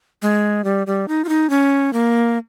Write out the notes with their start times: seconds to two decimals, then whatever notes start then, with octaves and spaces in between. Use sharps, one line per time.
0.22 G#3
0.64 G3
0.87 G3
1.08 D#4
1.24 F4
1.29 D#4
1.50 C#4
1.93 A#3